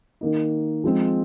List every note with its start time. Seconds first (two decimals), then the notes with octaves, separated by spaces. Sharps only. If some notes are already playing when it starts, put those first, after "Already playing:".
0.21 D#3 A#3 D#4
0.84 F3 G#3 C4